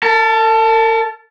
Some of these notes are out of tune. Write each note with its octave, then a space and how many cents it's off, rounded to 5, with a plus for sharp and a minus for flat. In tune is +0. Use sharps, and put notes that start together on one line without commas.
A#4 -45 A5 +0